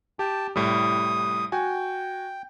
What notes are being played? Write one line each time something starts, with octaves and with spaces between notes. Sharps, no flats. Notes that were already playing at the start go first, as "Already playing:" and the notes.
G4 G5 A5
C2 A2 G3 D#6
F#4 G5 G#5